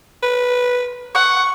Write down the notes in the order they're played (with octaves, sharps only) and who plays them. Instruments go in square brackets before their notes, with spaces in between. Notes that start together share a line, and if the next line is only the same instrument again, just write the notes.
[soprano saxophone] B4
[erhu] F#5 [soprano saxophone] C#6